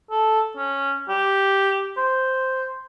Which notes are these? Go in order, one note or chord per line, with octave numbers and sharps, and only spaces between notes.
A4
C#4
G4
C5